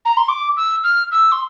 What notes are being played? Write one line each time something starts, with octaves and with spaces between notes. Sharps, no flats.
A#5
C6
D6
E6
F6
E6
C6